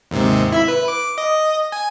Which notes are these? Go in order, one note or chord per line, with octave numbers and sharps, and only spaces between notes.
D#2 G#2 C3
E4 E5 B5
B4
D6
D#5
G#5